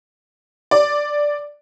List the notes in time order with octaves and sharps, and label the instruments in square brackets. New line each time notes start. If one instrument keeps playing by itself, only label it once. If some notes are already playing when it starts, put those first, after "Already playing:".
[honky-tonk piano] D5